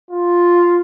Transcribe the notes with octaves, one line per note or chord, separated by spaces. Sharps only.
F4